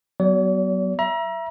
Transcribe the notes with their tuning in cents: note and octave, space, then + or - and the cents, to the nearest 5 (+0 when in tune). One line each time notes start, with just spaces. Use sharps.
F#3 +25 B3 +0 D5 -45
E5 +20 A#5 +35